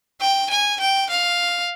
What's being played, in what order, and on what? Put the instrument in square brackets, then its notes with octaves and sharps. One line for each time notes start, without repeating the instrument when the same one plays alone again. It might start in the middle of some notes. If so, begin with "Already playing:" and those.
[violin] G5
G#5
G5
F5